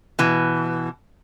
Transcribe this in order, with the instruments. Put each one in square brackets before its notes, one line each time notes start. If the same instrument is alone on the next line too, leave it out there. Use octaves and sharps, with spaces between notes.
[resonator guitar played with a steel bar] B2 E3